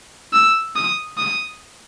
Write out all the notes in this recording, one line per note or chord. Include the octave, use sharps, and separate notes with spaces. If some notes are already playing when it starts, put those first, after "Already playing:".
E6
D#6
D#6